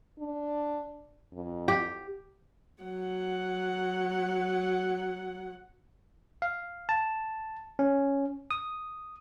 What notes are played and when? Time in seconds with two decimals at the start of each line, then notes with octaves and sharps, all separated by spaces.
0.19 D4
1.33 F2
1.68 G4
2.83 F#3 F#5
6.42 F5
6.89 A5
7.79 C#4
8.51 D#6